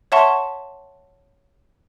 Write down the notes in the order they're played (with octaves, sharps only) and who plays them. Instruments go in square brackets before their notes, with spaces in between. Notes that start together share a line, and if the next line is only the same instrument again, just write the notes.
[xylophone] C#5 E5 F#5 A5 C6 C#6